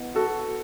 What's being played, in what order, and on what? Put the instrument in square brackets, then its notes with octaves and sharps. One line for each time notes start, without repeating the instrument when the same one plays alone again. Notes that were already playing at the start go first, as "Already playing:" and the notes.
Already playing: [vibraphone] B3 E4 B4 D#5 F#5
[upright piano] F#4 A4